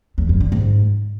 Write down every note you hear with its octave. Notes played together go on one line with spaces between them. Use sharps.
E2
F#2
D3
G#2